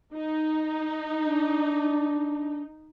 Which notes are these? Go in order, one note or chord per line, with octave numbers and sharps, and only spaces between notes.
D#4
D4